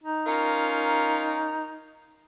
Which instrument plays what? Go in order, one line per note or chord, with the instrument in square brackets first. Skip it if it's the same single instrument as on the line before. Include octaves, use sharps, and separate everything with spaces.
[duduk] D#4
[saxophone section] C#4 F4 A#4